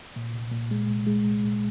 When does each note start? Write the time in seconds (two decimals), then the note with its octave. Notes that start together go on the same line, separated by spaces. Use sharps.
0.16 A#2
0.33 C2
0.52 A#2
0.71 G#3
0.89 C2
1.06 G#3
1.25 C2
1.44 A#2